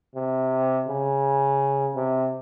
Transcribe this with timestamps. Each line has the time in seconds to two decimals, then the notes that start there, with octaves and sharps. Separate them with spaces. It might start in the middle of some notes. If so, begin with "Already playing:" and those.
0.15 C3
0.88 C#3
1.96 C3